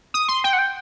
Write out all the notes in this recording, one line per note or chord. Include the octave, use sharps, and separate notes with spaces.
D#6
C6
G5
F#5
G5